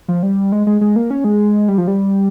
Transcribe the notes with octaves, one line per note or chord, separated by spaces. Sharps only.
F3
G3
G#3
G#3
G#3
A#3
C#4
G#3
G3
F3
G3